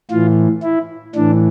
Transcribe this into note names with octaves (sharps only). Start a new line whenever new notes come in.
A2 E3 F4
E4
A2 E3 D4